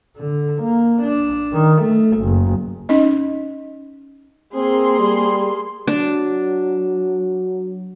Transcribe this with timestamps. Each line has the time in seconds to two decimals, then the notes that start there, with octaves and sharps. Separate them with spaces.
0.17 D3
0.62 A#3
1.02 D4
1.53 D#3
1.82 A3
2.18 F#1
2.89 C#4 D#4 D#5
4.55 A#3 C4 G#4 C6
4.99 G3
5.87 F#3 D4